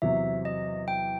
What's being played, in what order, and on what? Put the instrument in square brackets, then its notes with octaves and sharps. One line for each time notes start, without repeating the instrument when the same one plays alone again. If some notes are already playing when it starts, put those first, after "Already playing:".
[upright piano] E2 C3 F#3 [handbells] E5
[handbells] D#5
G5